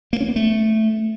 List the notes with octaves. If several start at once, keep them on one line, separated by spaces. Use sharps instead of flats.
A#3
C#4
B3
A3